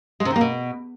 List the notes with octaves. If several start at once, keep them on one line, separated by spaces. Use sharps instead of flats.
G#3
C3
D#3
A#3
B2